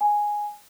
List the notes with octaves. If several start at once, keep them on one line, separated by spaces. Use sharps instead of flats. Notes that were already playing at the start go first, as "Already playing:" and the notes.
G#5